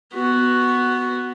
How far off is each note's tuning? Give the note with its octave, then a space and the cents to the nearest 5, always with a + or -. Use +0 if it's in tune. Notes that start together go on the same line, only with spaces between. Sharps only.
B3 +0 F#4 +0